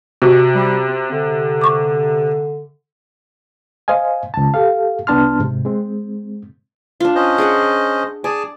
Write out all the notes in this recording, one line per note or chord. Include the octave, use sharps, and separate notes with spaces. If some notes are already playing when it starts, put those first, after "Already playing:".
C3 F#4
G3
C4
D3 E5
C#6 D6
C5 D#5 F5 G#5
C#2 A5
G4 A4 F5
C2 B3 D4 A5 C6 F6
G#2 C3
G#3 C4
D4 F4
C#4 C5 D#5
G#4 D5 F#5
G#4 D5 G#5 A5